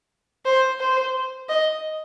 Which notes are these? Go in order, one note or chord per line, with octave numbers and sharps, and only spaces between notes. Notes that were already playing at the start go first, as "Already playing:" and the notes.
C5
C5
D#5